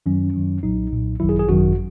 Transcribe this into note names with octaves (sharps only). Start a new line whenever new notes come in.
F#2 D#3 F#3 C#4
F#2 D#3 F#3
B1 A#2 F#3 D#4
B1 A#2 F#3
G#1 F#2 D#3 F#3 E4
G#4
G#4
G#1 F#2 D#3 F#3 F#4